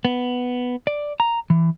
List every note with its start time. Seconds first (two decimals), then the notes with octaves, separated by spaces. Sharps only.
0.05 B3
0.87 D5
1.20 A#5
1.50 E3